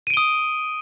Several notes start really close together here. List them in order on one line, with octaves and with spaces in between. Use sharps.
D#7 D7 G7 D#6